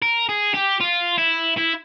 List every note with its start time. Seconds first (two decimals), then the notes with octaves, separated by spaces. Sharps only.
0.02 A#4
0.29 G#4
0.54 G4
0.80 F4
1.18 E4
1.57 E4